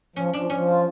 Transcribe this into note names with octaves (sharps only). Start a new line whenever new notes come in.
F3 C#4
F3 D4
F3 C#4
F4